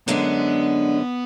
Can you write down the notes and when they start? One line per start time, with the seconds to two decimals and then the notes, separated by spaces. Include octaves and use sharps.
0.07 F#2 D3 G#3 B3 D4